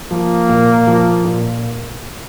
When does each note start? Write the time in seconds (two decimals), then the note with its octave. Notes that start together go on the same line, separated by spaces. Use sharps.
0.11 F3 A#3
0.49 A#2
0.87 F3
1.25 A#2